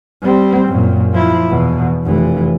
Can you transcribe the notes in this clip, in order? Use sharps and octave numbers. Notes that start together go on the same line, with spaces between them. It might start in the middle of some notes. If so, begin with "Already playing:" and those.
G3 C4
F#2 A#2
F3 E4
E2 B2
F1 E3